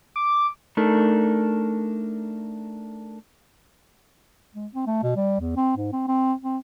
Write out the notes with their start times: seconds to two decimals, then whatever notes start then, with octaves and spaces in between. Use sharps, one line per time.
0.16 D6
0.77 A3 D4 D#4 A4 A#4
4.55 G#3
4.74 C4
4.86 A3
5.03 B2
5.16 G3
5.40 E2
5.56 C4
5.77 G#2
5.93 C4
6.08 C4
6.42 C4